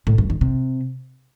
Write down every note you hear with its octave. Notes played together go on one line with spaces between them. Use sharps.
A2
G2
D#3
C3